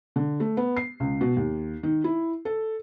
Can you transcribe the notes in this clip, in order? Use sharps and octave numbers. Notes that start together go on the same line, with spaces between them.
D3
A3
B3
C7
C#2
B2
D#2
D#3
E4
A4